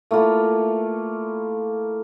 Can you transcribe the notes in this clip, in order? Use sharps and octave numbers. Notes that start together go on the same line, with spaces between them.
A3 A#3 E4 F4